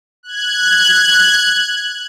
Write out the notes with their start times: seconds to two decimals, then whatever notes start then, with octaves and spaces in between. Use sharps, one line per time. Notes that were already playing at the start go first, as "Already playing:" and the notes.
0.23 F#6 G#6